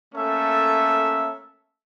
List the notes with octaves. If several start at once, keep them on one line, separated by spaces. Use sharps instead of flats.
A3 A#3 C#4 A4 E5